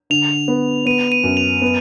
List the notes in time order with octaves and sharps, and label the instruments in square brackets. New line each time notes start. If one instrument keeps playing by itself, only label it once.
[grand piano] D3 [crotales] F7
[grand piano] B3
[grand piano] B3 [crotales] D#7
[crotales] D#7
[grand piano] F#2
[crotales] F7
[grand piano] B3